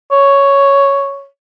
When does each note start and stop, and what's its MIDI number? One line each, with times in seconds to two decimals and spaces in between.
0.11 1.26 73